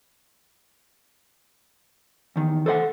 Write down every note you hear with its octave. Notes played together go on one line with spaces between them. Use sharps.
E2 D#3
A4 C5 D5 F#5